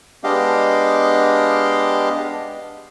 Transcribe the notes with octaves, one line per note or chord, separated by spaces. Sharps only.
G#3 B3 D4 G4 D#5 F5